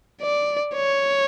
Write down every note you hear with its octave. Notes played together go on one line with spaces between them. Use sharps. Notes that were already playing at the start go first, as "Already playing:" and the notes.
D5
C#5